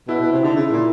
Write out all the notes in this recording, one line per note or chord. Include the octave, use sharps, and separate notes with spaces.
B2 E4
B2
C3
D3 D#4
C#3 E4
A#2 E4